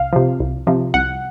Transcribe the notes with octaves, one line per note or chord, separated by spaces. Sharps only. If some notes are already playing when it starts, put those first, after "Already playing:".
Already playing: C2 F5
C3 F3
C2
C3 F3
C2 F#5